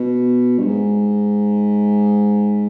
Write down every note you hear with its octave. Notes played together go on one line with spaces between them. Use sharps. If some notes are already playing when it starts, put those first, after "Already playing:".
Already playing: B2
G2
G#2